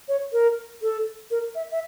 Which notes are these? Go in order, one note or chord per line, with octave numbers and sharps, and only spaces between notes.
C#5
A#4
A4
A#4
E5
E5